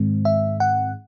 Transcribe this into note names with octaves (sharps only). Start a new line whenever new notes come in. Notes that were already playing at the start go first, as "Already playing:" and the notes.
Already playing: G#2 D#3 G#3 C4
E5
F#5